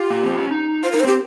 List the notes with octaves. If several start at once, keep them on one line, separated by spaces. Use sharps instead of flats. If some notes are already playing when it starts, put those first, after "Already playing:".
Already playing: F4 G4
A#3
C4
C#4
D#4
F4 C5
D#4 A#4
C5
C4 G4